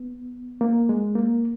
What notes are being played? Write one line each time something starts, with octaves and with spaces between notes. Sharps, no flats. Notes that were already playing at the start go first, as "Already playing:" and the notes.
Already playing: B3
A#3
G#3
A#3